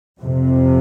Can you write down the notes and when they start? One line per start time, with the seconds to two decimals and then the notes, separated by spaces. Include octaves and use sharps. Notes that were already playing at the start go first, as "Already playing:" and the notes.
0.19 F2 C3